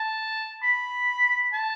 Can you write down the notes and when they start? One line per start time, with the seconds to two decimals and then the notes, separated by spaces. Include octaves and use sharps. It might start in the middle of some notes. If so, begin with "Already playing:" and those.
Already playing: A5
0.63 B5
1.53 A5